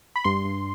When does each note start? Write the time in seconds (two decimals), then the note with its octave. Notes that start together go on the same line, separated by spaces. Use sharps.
0.16 B5
0.24 G2 C6
0.45 G2